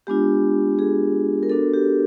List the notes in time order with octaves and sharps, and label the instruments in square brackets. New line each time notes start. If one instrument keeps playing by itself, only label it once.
[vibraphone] G#3 B3 D4 F4 G4
G#4
A#4
B3 D4 F#4 A4
G4